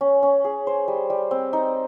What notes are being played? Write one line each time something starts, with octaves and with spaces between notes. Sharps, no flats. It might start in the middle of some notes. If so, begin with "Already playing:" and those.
C#4
C#4
G#4
C5
G3
G3
C4
D#4